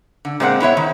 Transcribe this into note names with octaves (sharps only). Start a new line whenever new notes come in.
D3
A#2 G#3 C4 A#4 F#5
B3 E4 C#5 E5
D#3